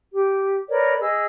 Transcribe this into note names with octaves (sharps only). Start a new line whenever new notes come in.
G4
A#4 B4 C#5 D5
G#4 D#5 E6